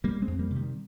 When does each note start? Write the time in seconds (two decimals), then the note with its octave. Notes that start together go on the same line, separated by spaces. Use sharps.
0.04 C3 G3 A#3
0.22 G#3 C4
0.27 F2
0.39 G3 A#3
0.50 C3
0.56 D#3 G3